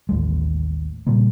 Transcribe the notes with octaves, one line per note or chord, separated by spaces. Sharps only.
A1 D#2 G#3
A#2 C#3 G3 A#3